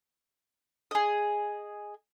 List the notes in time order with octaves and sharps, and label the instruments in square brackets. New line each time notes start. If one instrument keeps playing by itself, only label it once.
[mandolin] G#4 D#5